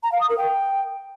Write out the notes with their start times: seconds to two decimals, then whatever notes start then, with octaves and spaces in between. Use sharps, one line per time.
0.03 A#5
0.12 F5
0.20 D#6
0.29 A#4
0.38 G5